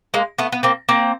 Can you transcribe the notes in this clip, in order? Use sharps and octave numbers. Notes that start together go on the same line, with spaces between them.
G#3 A#3
A3 B3
B3
A#3 C4
A#3 C4